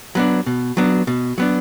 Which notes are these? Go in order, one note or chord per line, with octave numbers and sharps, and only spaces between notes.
F#3 B3 D4
B2
F#3 B3 D4
B2
F#3 B3 D4